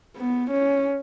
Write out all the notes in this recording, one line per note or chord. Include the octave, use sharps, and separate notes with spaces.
B3
C#4